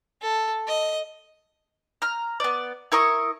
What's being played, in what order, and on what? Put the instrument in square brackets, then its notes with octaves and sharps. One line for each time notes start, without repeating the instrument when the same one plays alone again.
[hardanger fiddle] A4
D#5
[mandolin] A#5 F6
B3 D5
E4 A#4 C#6 D#6